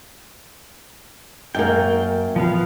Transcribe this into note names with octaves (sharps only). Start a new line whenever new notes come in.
F#2 A#3 G5
F3 B3 F5